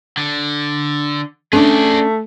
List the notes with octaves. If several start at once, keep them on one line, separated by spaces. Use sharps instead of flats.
D3
A3 C#4 D4 G#4 D5